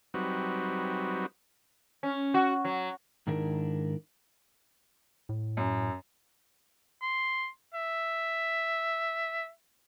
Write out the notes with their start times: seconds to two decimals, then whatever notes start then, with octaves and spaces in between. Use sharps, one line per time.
0.14 F#3 G3 C4 D#4 F#4 B4
2.03 C#4
2.34 F#4
2.65 F#3
3.27 G#2 D#3 D4 E4 A#4
5.29 A2
5.57 F#2
7.02 C6
7.74 E5